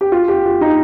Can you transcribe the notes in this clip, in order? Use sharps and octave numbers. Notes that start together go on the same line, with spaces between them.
G4
F4
G4
F4
D#4